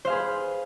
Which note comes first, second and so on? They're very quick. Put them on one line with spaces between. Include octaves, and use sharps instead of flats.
C5 F5 G#4 B4